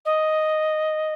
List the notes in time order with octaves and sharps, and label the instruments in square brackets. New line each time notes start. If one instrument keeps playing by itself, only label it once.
[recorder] D#5